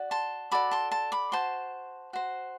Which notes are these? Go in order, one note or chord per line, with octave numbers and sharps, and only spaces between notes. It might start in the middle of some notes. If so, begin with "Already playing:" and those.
Already playing: F#4 D5
A5 C6
F#4 A4 D5 B5 D6
A5 C6
A5 C6
B5 D6
F#4 C5 A5 C6
F#4 C5